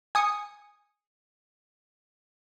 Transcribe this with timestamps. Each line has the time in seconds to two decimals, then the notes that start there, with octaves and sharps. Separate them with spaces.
0.15 G#5 D#6 C#7